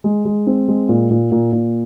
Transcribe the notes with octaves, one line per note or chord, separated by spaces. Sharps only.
G#3
G#3
C4
G#3
A#2
A#2
A#2
A#2